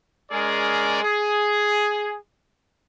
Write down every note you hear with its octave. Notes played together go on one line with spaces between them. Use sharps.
G#3 C#4 G#4 A#4 D5
G#4